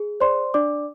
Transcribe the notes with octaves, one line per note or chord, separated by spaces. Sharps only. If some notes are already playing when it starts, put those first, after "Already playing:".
Already playing: G#4
C5 D5 C6
D4 D5 D6